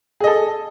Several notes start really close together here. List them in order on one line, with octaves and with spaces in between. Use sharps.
G#4 D#5 A4